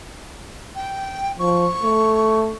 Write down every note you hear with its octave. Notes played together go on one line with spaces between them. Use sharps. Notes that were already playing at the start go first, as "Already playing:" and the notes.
G5
F3 C#6
A3